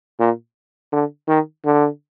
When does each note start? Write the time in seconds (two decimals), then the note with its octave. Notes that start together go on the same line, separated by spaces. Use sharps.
0.20 A#2
0.92 D3
1.28 D#3
1.65 D3